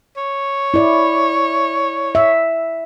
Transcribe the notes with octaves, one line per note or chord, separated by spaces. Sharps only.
C#5
E4 D5
E5